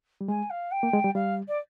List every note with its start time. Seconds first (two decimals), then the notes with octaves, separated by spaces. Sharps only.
0.21 G3
0.28 G#3 G#5
0.50 F5
0.72 G5
0.83 A#3
0.93 G#3
1.04 G3
1.15 G3 F5
1.48 D5